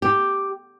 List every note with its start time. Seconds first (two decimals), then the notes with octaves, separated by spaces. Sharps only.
0.02 G4